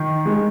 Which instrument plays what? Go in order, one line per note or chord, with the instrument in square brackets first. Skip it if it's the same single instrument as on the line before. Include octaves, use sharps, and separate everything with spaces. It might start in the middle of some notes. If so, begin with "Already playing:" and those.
Already playing: [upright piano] D#3
G#3